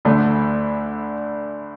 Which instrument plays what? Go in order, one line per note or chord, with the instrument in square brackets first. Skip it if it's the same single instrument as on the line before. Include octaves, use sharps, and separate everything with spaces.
[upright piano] D2 D3 A3 D4